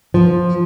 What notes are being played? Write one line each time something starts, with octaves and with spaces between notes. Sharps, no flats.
F3